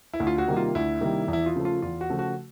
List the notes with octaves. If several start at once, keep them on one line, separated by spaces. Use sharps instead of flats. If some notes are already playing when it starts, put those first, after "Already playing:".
E4
D2
F4
F#4
C3 D#3 G3 A#3
F4
D2 E4
C3 D#3 G3 A#3
E2
E4
F4
C#3 F3 A3
F4
E2 F4
F#4
C#3 F3 A3
F#4